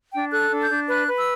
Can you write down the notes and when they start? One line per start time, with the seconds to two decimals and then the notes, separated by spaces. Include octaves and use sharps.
0.12 D4 G5
0.32 A4 F#6
0.51 D4
0.61 G6
0.70 D4
0.89 B4 F#6
1.08 B4
1.18 E6